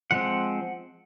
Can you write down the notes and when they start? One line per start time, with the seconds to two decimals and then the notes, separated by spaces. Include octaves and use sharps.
0.11 F3 G#3 C4 F#5